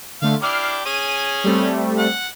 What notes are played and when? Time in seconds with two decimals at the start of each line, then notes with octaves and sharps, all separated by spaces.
0.22 D3 A3 F5 C6
0.42 D4 E4 G4 D6 F6 C7
0.85 C#4 G#4 D#7
1.44 G3 A3 C4
1.98 F#5